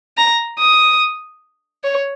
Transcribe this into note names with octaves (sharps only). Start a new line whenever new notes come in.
A#5
D#6
C#5